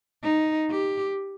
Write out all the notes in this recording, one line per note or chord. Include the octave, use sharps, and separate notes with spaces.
D#4
G4